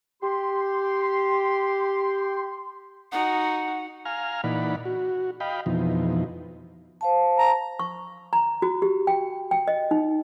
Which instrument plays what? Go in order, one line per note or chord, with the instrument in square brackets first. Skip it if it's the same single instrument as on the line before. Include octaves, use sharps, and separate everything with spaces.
[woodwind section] G4 C6
[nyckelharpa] D#4 F#4 [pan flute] F#5
[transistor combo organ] F5 G#5 A#5 F6
A#2 E3 D#4 D5 F#5 B5
F#4
D#5 F5 G5 B5
F2 B2 E3 F3 D#4
[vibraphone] C5 F5 A5
[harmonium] A#5
[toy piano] C#6
A#5
F#4
G4
G5
G5
D#5
D#4